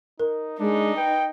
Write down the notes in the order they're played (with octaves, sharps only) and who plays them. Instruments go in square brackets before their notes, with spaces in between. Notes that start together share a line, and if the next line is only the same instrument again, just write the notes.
[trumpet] D#4 [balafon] A#4
[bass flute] G#3 [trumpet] D4 [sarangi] D#4
[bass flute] B4 [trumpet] G5